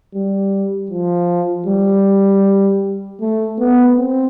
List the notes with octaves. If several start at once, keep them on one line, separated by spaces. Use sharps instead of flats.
G3
F3
G3
A3
B3
C4